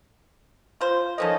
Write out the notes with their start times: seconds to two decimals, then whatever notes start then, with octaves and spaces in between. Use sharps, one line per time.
0.81 F4 C5
1.18 F3 A#3 C#4 D#4 A4 D#5